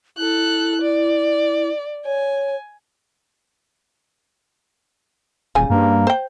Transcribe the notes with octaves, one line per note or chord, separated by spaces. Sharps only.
E4 A4 F#6
D5
C#5 G#5
D#1 C#3 G3 G#5
G2 A#3
C5 G5